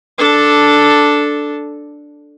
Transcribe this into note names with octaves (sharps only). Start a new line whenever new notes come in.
D4 A4